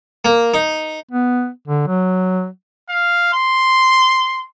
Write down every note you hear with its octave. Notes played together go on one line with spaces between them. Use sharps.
A#3
D#4
B3
D3
F#3
F5
C6